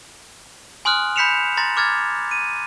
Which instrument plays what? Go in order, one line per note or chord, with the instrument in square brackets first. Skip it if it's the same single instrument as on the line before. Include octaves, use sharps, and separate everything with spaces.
[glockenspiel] G#5 C6 D#6 F6 F#6
B5 G6 B6 C#7 E7 F7
A#5 C6 A6 A#6
D6 F6 G#6 A6
D#7